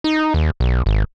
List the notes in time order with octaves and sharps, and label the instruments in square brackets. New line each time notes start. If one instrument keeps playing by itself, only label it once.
[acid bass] D#4
D#2
B1
G#1